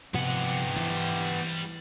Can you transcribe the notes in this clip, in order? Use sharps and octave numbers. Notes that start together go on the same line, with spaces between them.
G#2 C3 F3 B3 G4 F#5
E3 G3 C5